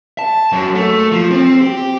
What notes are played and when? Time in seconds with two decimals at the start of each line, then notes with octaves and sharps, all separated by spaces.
0.19 A5
0.52 F#2
0.75 A3
1.12 F3
1.31 C4
1.61 G4